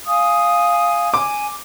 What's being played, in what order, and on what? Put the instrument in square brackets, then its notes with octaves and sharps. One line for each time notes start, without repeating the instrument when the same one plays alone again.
[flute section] F5 G#5 D#6
[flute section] G#5 [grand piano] D6